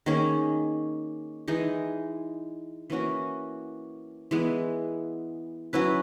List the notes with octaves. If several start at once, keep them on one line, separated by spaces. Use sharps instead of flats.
D#3 A#3 C#4 G#4
E3 G#3 D#4 G#4
E3 A#3 C#4 F#4
E3 G#3 B3
F#3 C#4 E4 B4